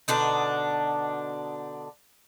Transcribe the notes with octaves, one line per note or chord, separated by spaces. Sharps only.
B2 D3 D4 D#4